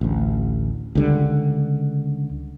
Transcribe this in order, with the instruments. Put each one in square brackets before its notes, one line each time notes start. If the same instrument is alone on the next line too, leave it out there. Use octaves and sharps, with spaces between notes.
[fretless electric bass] A1 D2
C#2 D3 G3